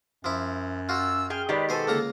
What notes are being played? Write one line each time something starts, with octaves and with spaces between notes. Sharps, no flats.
F#2 F3 E4
F4 F#4 E6
G#4 G5 F6
D#3 G#3 G4 B4 D5
B2 A4 C5 G#5
C#2 D3 A#3 A#5